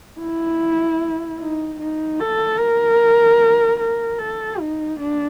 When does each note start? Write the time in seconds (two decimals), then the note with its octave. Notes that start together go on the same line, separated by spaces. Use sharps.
0.20 E4
1.40 D#4
1.79 D#4
2.20 A4
2.59 A#4
3.80 A#4
4.19 A4
4.60 D#4
4.99 D4